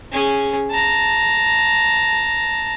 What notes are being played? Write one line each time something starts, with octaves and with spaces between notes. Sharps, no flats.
C#4 G#4
A5 A#5